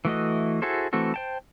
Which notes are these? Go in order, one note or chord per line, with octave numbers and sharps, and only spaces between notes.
E3 A3 F#4 D#5
E4 F#4 G#4 A4 C5
E3 A3 C4 F#4 A4
C5 G5 A5